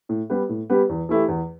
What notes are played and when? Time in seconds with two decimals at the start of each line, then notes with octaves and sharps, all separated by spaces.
0.09 A2
0.30 G3 B3 G4 B4
0.49 A2
0.70 G3 B3 G4 B4
0.89 E2
1.09 E3 A3 E4 G4
1.28 E2